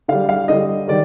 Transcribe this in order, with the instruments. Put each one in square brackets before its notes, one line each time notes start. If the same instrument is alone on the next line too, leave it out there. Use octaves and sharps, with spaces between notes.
[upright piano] D3 G3 F5
F5
D3 G3 D#5
D#3 G3 D5